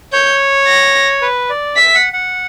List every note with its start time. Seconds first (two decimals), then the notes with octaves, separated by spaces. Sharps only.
0.13 C#5 G6
0.67 A#6
1.22 B4
1.50 D5
1.76 E5 B6
1.94 F#5
2.13 F#5